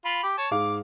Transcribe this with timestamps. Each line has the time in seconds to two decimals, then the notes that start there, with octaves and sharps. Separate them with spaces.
0.05 F4 B5
0.24 G4
0.38 C#5 A5
0.51 G#2 G#4 F5 D6